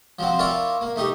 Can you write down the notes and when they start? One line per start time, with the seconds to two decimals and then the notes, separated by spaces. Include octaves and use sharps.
0.19 F3 F#3 C4
0.39 E4 F4 A#4 C#5 D5
0.81 A#3
0.96 A3 D#4 G4